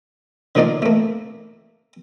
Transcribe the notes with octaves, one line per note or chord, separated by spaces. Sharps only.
D3 F3 A#3 D#4 D5 F5
A3 A#3